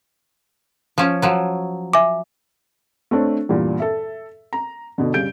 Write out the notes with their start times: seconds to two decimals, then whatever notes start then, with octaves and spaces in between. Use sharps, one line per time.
0.98 F3 C#4
1.22 F3 F#3
1.93 E5 G#5 D6
3.11 A3 C4 D4 C#5
3.49 E2 G2 A#2
3.80 A4 E5
4.53 A#5
4.98 B2 D3
5.14 G2 C#3 G6 D7